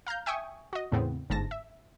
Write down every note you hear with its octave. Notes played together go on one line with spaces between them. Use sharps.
F5 A#5 F6 G6
E5 G5 G#5 C#6 D#6
F#4 D#5
E2 A2 C#3 B3 C4
G1 G#2 A5 A#6
E5